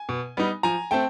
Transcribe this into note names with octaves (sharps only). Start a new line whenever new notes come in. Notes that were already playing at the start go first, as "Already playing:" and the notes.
Already playing: G#5
B2
G3 B3 D#4
F3 G#5 A#5
A3 C4 G5 A5